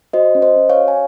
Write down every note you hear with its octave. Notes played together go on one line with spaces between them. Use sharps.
F#4 C5 D#5
C#4
C5 D#5
C#4
C#5 F5
F#4
G#5